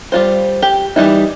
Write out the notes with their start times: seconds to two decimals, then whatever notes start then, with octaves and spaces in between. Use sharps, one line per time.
0.12 G3 F4 C5
0.62 G4
0.96 E3 G3 D#4 E4